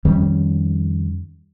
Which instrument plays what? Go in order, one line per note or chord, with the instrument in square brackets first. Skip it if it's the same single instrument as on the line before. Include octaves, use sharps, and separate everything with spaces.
[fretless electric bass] F2 D#3 G3 C#4